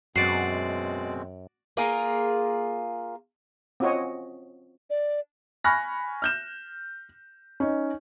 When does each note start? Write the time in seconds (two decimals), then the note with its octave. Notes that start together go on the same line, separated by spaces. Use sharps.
0.16 F#2 B2 G#3 C4 F#4 D5 C7
1.77 A#3 F4 G#4 A#4
3.80 C4 C#4 F4 F#4 C#5 D#5
4.90 D5
5.65 G#5 B5 C#6 F6 F#6 A#6
6.22 F6 G6 E7
7.60 C#4 D#4